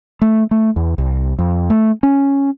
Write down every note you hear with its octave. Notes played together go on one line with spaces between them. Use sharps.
A3
A3
E2
C2
F2
A3
C#4